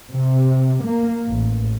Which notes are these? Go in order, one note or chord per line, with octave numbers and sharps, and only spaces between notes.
C3
A#3
A1